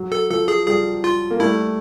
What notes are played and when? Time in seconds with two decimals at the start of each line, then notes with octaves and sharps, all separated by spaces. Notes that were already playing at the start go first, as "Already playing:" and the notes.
Already playing: F#3
0.12 A4
0.30 F3 A4
0.48 G#4
0.67 F3 G3 G#4
1.04 F4
1.31 A#3
1.40 G3 A3 E4